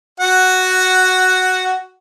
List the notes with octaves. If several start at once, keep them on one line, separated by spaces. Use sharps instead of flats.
F#4 F#5